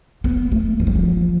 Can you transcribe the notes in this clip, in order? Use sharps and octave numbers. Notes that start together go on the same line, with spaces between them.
B3
A3
F3
G3
F3